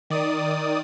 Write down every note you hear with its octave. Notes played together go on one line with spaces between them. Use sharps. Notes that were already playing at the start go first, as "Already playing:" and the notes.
D#3 D5 D#6